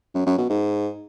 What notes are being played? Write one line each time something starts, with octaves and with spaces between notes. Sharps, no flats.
F#2
F#2
B2
G#2